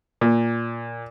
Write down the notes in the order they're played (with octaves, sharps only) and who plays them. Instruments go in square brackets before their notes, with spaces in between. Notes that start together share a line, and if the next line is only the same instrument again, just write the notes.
[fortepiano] A#2